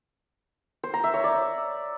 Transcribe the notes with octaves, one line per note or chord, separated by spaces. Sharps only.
C5
A#5
E5
C#5
D5